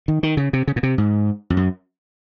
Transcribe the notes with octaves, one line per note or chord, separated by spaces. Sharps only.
D#3
D#3
C#3
C3
C#3
A#2
C3
G#2
F2
F#2